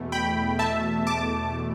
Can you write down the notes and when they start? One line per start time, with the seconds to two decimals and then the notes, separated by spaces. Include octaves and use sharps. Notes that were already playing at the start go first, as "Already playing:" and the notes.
Already playing: E2 B2 A3
0.12 G5 B5
0.59 E5 A5
1.07 A5 D6